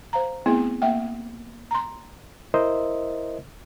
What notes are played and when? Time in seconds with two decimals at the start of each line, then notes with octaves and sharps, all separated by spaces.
0.13 C5 F5 A#5
0.46 A3 B3 C4 E4 G#4
0.82 A#3 E5 F#5 G5
1.71 A#5 C6
2.54 E4 A#4 C5 D#5 E5